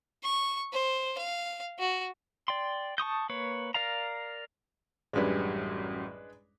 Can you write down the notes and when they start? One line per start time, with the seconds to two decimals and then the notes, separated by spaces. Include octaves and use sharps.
0.23 C#6
0.72 C5
1.17 F5
1.79 F#4
2.48 D5 G5 C6
2.98 A5 C#6 D#6 G6
3.29 A#3 B4 C#5
3.74 A#4 D5 F5 A#5
5.13 A1 F#2 G3 G#3 D4 B4